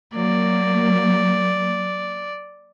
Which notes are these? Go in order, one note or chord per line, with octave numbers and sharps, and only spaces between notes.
F#3 A#3 D5